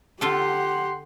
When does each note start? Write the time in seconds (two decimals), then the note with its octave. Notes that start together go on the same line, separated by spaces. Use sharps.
0.21 D3 F4 G4 A4 F#5 C6